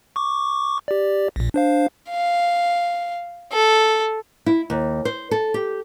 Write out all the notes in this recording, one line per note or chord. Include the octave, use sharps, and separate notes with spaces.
C#6 D6
G4 D5
A#1 A#2
D4 C5 F5
F5
A4
E4
D#2
C5
A4
G4